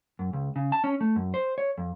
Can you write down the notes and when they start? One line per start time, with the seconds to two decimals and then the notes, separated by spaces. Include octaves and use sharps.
0.19 F#2
0.33 C#2
0.56 C#3
0.72 A5
0.84 C#4
1.01 A3
1.16 F#2
1.34 C5
1.58 C#5
1.78 F2